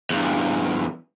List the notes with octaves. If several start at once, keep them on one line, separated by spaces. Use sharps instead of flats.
E2 G2